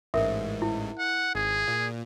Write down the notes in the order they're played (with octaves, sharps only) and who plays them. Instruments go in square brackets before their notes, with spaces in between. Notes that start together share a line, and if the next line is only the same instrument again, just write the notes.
[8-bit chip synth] A1 G#2 [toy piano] A4 A#4 E5
[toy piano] E4
[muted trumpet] F#5
[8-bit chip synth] G#1 [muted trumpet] G#4
[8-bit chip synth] A#2